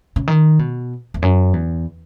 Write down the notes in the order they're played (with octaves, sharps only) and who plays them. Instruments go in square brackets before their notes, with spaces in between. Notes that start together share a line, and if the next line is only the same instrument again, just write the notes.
[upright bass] C#3
D#3
B2
E2
F#2
E2